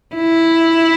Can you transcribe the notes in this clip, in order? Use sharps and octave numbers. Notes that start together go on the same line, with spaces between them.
E4